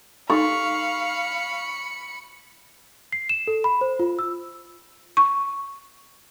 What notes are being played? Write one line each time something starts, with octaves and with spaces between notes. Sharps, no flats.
D#4 A4 F5 B5 C#6 C#7
C7
E7
A4
B5
C5
F4
E6
C#6